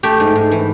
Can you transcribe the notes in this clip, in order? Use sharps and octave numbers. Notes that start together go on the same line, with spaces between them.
A3 G4
G#2
G#2
E3